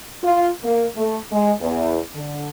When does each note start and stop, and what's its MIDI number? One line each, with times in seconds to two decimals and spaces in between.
0.23 0.50 65
0.64 0.88 58
0.96 1.19 57
1.32 1.52 56
1.60 1.99 40
2.15 2.48 50